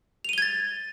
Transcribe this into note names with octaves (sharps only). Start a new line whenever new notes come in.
G#6 A6 D#7 F7 G7